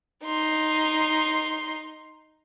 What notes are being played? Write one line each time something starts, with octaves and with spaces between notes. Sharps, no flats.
D#4 C6